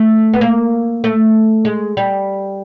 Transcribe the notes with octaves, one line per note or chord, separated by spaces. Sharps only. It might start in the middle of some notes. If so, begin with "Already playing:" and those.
Already playing: A3
B3
A#3
A3
G#3
G3